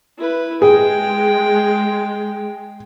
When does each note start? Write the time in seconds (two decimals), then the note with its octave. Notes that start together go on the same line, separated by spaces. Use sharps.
0.18 E4 B4
0.62 G#3 G#4 G5